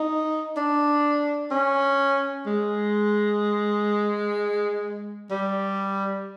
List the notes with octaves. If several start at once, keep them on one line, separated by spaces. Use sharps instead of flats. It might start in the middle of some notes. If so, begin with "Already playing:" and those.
Already playing: D#4
D4
C#4
G#3
G3